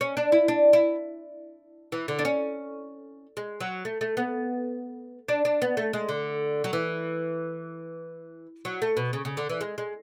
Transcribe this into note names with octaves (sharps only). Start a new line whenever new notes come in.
C#4
D4
E4
D4
E4
E3
D3
D4
C#4
G#3
F#3
A3
A3
B3
D4
D4
B3
A3
G#3
D3
F#3
E3
F#3
A3
B2
C#3
C#3
D3
E3
G#3
G#3